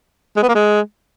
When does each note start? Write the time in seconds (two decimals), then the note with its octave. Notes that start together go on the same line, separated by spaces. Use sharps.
0.37 G#3
0.43 B3
0.49 A#3
0.55 G#3